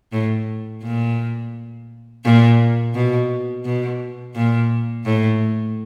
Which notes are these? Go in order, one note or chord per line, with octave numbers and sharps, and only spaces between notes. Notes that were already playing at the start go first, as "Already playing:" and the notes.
A2
A#2
A#2
B2
B2
A#2
A2